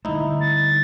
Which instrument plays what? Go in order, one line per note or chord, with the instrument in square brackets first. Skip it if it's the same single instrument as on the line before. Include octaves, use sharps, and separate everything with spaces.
[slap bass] D3 G3 A3 [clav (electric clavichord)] D#4 E4
[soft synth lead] A6